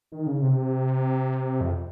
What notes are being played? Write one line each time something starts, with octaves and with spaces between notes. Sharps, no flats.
D#3
C#3
C3
F2